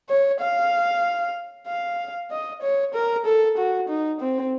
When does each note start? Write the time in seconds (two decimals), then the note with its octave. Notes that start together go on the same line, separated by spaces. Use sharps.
0.09 C#5
0.41 F5
1.67 F5
2.30 D#5
2.62 C#5
2.94 A#4
3.26 A4
3.57 F#4
3.89 D#4
4.21 C4